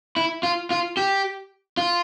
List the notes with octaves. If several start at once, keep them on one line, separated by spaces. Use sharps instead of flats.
E4
F4
F4
G4
F4